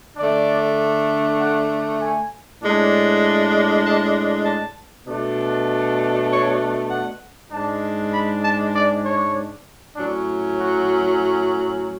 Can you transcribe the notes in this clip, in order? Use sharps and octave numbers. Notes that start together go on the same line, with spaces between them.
D3 A3 D4 D5
F#5
G#5
A2 G#3 D4
A5
A5
B2 A3 D4
C#5
F#5
G#2 G#3 D4 A5
B5
A5
D5
C#5
A2 F#3 C#4 D4
F#4